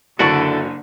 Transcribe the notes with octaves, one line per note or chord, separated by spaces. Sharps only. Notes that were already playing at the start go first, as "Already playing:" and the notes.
F#1 D3 E4 F#4 A4 D5 C#6